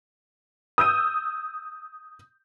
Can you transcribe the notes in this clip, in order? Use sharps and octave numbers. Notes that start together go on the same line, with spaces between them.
D#6 E6 G6 D#7